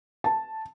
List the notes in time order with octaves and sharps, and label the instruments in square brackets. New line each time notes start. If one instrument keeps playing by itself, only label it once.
[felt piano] A5